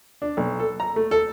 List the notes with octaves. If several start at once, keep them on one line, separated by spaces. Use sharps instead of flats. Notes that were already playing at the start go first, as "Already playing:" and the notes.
D4
B1
A4
A#5
A3
A4